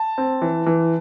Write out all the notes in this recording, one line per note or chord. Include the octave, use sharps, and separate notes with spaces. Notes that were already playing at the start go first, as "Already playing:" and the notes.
Already playing: A5
C4
E3
E3